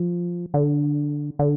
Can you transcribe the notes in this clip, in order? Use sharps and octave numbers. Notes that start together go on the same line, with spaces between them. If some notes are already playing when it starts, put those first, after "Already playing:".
Already playing: F3
D3
D3